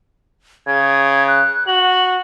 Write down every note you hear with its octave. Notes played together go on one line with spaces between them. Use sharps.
C#3 G#6
F#6
F#4 F#7